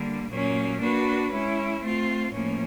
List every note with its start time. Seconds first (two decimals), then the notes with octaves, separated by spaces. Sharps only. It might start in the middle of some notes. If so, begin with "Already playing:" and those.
Already playing: D3 G3 A#3
0.30 A#2 F#3 A#3 C#4
0.80 A#3 D4 F#4 B4
1.30 G#3 C#4 E4
1.81 A3 C4 F4
2.32 A2 F3 A#3 C#4